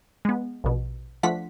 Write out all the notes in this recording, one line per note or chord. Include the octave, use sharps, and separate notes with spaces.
G#3 B3
A#1 B2
F3 A3 D4 F4 F#5 B6